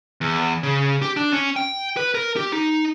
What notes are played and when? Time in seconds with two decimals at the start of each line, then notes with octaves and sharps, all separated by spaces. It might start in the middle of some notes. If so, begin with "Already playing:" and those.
0.21 E2
0.63 C#3
1.02 G4
1.17 D4
1.33 C#4
1.56 G5
1.97 B4
2.15 A#4
2.37 G4
2.52 D#4